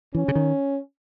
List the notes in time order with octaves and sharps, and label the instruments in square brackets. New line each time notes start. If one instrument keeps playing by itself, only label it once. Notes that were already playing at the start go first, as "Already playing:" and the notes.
[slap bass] E3 [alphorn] C#4
[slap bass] C#3
D#3